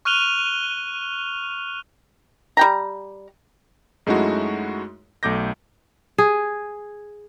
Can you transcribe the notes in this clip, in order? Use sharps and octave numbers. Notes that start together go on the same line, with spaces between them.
C#6 F6 F#6 D#7 F7 G7
G3 G5 A#5
F#2 G#3 A3 D#4 E4 F#4
B1 A3 D6 G6 A#6
G#4